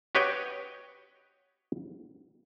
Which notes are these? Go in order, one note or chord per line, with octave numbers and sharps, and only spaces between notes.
F#4 G4 B4 C#5 D#5 G5